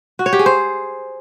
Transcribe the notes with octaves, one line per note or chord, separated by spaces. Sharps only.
F#4
C#5
G4
G#4
C5